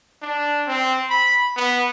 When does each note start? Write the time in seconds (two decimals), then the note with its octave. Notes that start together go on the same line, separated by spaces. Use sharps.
0.22 D4
0.67 C4
1.10 B5
1.56 B3